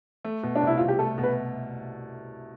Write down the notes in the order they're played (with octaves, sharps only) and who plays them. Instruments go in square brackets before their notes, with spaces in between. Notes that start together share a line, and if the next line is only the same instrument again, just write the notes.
[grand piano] A3
B2
[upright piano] D4
[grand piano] C2 [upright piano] E4
[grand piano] C2 [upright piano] F4
[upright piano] G4
[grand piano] A3 [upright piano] A4
[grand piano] B2
[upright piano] B4